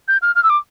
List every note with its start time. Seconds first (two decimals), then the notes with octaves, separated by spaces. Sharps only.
0.08 G6
0.22 F6
0.35 F6
0.43 E6
0.50 D6